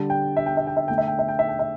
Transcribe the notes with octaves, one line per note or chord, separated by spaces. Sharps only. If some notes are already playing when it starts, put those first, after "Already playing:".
Already playing: D3 G3 A5
G5
E5
G5
E5
G5
E5
D3 A3 G5
E5
G5
E5
G5
E5
G5
E5